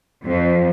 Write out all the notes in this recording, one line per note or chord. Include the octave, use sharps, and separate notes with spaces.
F2